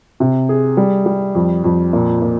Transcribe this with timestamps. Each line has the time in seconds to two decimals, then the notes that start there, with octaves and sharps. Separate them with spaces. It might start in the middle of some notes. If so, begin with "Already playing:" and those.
0.20 C3
0.49 G#4
0.77 G3
1.06 G3
1.35 F2
1.64 F2
1.93 A#2
2.22 A#2